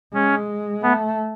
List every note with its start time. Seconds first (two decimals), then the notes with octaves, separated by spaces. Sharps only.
0.13 G#3 C#4
0.83 A3 B3